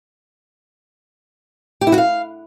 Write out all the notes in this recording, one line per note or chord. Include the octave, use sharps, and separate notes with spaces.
G4
E4
F#4
F5